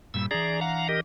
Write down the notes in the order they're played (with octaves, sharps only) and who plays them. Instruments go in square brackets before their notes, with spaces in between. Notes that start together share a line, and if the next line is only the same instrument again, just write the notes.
[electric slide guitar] G2 A#2 G3 [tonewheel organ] E6
[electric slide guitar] E3 D4 [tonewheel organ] G#4 D5 A#5
[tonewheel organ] F5 F#5 A#5
G4 A#4 D#5